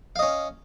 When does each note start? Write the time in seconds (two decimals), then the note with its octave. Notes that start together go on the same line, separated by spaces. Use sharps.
0.16 F5
0.19 D#5
0.23 C#4